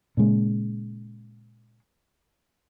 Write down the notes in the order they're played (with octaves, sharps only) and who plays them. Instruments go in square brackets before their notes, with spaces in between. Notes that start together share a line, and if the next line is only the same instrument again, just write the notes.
[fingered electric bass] A#2 C#3 G#3